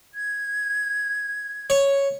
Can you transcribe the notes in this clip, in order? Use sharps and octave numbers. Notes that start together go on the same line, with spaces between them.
G#6
C#5